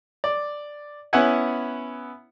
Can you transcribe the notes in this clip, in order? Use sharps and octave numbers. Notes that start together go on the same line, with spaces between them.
D5
B3 C#4 E4 F#5 G#5